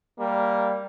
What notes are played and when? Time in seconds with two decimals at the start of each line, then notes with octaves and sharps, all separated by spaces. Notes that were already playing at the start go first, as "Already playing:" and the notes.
0.19 G3 A#3